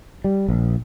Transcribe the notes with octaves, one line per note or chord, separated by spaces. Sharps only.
G3
A#1